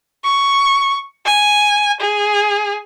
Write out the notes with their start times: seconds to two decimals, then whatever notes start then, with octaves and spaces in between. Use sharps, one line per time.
0.24 C#6
1.26 G#5
2.00 G#4